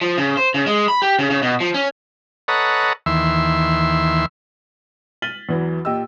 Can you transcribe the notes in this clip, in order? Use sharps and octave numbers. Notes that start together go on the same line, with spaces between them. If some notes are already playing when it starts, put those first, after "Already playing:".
F3
C#3
C5
C#3
G#3
B5
G4
C#3
C#3
B2
F3
C#4
A4 B4 C#5 D#5 F#5 A#5
D#2 E3 E5 C6
F6 A6 B6 D#7 F#7 G7
E2 E3 F#3
A#2 G4 D#5 E6